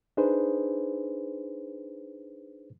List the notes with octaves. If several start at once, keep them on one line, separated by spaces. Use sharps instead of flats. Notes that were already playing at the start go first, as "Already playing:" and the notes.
D4 D#4 G#4 B4 C5